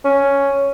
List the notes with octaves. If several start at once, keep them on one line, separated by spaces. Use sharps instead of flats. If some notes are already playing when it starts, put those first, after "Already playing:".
C#4